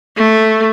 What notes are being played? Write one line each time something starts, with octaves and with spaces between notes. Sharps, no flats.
A3